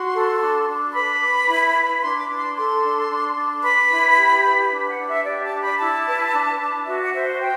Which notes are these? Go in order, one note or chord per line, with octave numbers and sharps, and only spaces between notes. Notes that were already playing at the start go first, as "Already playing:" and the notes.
Already playing: F#4 C6
A4
D4
D4
B4 B5
B4
E4
B4
D4 C6
D6
D4
C6
A4 C6
D4
D4
D4
B4 B5
E4
G4
B4
D4
F#5
D4
E5
G4 D5
A5
D4
B5
E4 A5
B4
D4
D4
F#4 E5
F#5
C5 E5
C5 G5